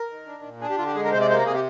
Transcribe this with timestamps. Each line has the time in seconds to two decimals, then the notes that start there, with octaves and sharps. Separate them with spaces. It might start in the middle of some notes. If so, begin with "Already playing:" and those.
Already playing: A#4
0.10 D#3
0.27 D4
0.43 A#2
0.61 D4 G#4
0.70 G4
0.78 D3 F4
0.86 G4
0.95 G#3 G#4
1.04 A#4
1.12 C3 C5
1.21 D5
1.29 A#3 C5
1.38 A#4
1.46 C3 G#4
1.54 G4